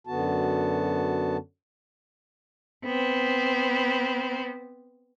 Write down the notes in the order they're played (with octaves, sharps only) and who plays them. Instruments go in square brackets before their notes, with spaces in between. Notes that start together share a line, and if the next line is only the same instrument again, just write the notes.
[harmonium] F#2 D3 B3 F#4 A5
[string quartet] B3 C4